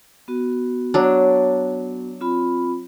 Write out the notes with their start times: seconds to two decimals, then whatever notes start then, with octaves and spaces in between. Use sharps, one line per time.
0.28 B3 F#4
0.94 F#3 D4
2.21 C4 F4 B5